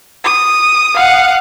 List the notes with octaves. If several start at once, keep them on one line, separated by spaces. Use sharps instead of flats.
D#6
F5 F#5